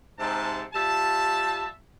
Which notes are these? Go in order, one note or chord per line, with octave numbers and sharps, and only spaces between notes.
G#2 C3 A5
G3 F4 E5 A5